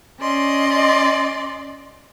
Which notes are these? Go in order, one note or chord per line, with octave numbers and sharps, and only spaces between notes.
C#4 D5 D#5 C6